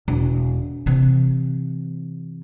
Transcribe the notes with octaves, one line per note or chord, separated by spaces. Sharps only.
E1
C3 E3